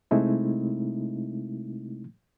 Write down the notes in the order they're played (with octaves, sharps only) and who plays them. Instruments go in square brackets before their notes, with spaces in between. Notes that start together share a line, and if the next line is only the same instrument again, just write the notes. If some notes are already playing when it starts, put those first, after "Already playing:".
[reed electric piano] C3 G#3 A3 C4 D#4 E4